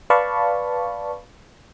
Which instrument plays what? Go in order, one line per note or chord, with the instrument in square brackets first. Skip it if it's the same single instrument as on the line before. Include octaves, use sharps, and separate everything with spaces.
[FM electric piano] B4 D5 F5 A5 B5 C#6